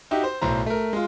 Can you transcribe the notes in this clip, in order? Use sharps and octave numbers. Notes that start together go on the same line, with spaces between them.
D#4 F#4 G4 E5
C5
B1 A2 C5 A#5
A3 A#4
G#3 F4